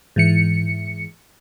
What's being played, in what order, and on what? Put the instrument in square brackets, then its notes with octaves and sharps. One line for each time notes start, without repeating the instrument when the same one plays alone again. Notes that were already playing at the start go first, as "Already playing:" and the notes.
[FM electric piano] G#2 E3 C#7